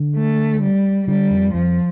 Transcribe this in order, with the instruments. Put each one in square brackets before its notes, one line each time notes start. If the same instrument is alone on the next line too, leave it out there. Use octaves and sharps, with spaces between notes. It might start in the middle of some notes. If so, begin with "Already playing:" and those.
Already playing: [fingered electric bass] D3
[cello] A3
G3
[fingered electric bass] D3 [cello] G3
[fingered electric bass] F2
[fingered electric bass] F2 [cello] F3